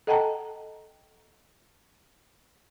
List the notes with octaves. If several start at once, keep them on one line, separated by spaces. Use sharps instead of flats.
A4 D#5 F#5 G5 A5 A#5